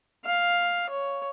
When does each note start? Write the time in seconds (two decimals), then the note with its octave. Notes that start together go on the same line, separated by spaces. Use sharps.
0.25 F5
0.90 C#5